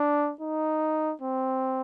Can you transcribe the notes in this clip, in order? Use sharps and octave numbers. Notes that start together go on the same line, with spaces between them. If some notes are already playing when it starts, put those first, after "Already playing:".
Already playing: D4
D#4
C4